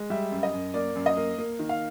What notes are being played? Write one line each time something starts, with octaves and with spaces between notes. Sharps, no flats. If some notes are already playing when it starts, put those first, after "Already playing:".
Already playing: G#3
G3 E5
F#2
D#5
F#2
A#3 D5
F#2
D#5
A#3
A#3
D#3
F5